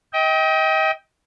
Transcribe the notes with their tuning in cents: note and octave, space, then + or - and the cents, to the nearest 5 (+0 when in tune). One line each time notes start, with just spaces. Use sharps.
D#5 +35 G5 +0